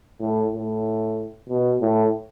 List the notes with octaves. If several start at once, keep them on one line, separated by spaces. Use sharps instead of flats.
A2
A2
B2
A2